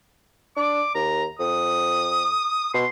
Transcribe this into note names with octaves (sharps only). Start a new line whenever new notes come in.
D4 D6
D#2 A#5
F2 D#6
B2 C6